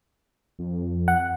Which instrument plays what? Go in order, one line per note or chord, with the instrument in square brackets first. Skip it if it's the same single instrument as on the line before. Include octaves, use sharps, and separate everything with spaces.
[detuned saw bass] F2
[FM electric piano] F#5